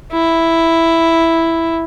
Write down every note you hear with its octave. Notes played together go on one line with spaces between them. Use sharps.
E4